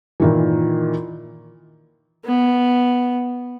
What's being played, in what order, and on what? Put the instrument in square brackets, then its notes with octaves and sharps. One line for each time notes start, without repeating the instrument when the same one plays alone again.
[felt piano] A#2 D#3 E3
[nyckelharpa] B3